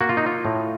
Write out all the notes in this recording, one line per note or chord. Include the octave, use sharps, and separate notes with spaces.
A#3 F#4
F4
D#4
F4
A2